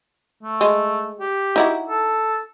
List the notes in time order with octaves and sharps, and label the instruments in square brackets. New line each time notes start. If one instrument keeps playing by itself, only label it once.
[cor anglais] A3
[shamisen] G#3
[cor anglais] G4
[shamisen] D#4 E4 F#4
[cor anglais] A4